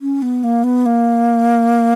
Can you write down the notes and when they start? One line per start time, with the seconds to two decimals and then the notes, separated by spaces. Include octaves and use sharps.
0.02 C#4
0.22 B3
0.44 A#3
0.64 B3
0.86 A#3